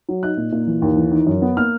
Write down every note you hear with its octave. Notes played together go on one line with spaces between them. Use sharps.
F#3
D#4 F#6
A#2
A#2
E3
D#2
E3
D#3
F#2
B3
A#3 F6